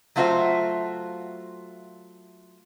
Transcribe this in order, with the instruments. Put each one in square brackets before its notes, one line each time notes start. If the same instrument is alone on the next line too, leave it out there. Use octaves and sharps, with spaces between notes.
[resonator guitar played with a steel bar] F#3 A3 F4 F#4 C5 E5